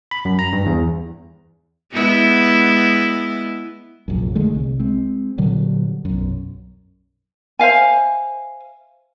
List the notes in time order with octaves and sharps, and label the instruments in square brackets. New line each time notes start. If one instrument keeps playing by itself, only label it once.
[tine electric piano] B5
F#2
A#5
G2
E2
[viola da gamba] G#3 B3 E4
[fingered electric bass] F1 A#1 F#2
D3 D#3 G#3 A3
C2
G#3 C4
A#2 D3 F#3 G3
B1 F#2
[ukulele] C5 E5 F5 G#5